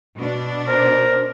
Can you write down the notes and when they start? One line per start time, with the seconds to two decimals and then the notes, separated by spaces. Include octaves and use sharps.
0.17 B2 D4
0.68 A#4 C5